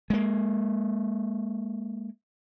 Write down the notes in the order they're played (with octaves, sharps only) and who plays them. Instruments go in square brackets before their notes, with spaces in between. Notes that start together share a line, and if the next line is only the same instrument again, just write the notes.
[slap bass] G#3 A#3